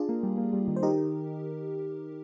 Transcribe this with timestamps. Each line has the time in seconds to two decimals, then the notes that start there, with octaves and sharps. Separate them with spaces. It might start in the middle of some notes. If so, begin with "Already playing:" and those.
Already playing: D4 F4 G#4
0.09 A#3
0.23 G3
0.38 A#3
0.53 G3
0.68 D#3
0.76 C5
0.83 D#4 G4 A#4